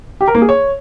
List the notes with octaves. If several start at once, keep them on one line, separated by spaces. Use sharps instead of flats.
G4
A#4
A#3
G#4
C#5